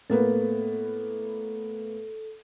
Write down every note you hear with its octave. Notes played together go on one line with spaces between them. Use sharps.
A2 A#3 B3 A4